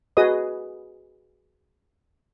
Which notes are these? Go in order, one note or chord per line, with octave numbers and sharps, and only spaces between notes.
F#4 G#4 B4 D#5 D#6